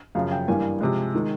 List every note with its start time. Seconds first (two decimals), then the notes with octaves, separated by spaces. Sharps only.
0.15 F#2 C#3 F3 F5
0.32 G5
0.48 G2 E3 G3 A#3 G#5
0.80 C3 F3 G#3
1.15 D#3 G#3